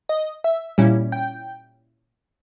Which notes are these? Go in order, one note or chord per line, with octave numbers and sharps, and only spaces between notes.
D#5
E5
A#2 G3 C#4 E4
G5